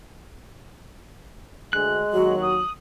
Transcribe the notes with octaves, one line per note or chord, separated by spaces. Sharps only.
D2 G#3 F#6
D#2 F#3 F#4
D#6